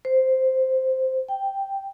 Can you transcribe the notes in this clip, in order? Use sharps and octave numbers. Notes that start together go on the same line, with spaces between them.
C5
G5